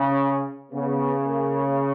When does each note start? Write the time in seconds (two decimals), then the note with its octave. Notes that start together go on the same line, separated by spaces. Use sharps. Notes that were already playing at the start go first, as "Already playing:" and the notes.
Already playing: C#3 C#4
0.72 C#3 B3
1.26 A#3